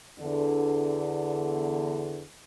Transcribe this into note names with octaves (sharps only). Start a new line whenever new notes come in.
E2 D3